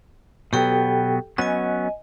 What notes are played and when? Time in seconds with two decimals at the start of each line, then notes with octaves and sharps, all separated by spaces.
0.53 B2 F#3 B3 G4 A4 G5
1.38 F#3 B3 C#4 D#5 G#5